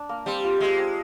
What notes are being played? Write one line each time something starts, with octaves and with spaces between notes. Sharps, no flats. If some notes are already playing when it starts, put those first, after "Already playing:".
Already playing: D4
A#3
G3 C4
F4
G#3 C4
C4